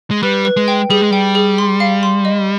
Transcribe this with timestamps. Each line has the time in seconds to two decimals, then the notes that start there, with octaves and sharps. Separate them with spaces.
0.11 G#3
0.23 G3 B4
0.45 B4
0.57 G#3
0.68 G5
0.90 G3 G#4
1.01 G#3
1.11 G3 G5
1.35 G#4
1.58 C6
1.80 F5
2.03 C6
2.25 D#5